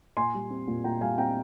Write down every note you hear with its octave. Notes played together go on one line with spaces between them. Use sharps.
A#2 G#5 C6
G3
C4
A#2
A#2 G5 A#5
G3 F5 G#5
C4 G5 A#5